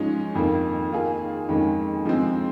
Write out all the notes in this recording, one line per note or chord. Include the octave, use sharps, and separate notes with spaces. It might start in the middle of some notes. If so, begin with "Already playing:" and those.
Already playing: G#2 F3 G#3 C#4
F2 D#3 A#3
D#3 A#3 F4 G#4
F2 D#3 G#3 C#4
F3 G#3 C4